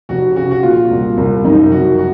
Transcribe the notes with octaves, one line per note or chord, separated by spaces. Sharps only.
F1 F#4
C#3 F#4
F#4
A#2 F4
C2
C2
F#2 D#4
F#1 F#4
F#4